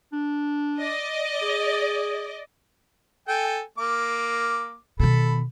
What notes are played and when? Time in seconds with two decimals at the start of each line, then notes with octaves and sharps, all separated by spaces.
0.12 D4
0.80 D5 D#5
1.42 G#4
3.28 A4 G5 G#5
3.78 A#3 D6
5.00 B2 D#3 A4 B5